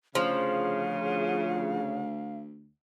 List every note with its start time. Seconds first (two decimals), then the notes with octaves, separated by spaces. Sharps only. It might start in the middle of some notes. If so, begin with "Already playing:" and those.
0.15 D2 C#3 F3 F5